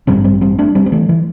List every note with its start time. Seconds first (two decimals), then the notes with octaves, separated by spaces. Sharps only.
0.07 A1 G2 D3 G3 C4
0.24 G3 C4
0.41 G3 C4
0.58 A3 D4
0.75 G3 C4
0.86 C4
0.92 E3 A3
1.09 E3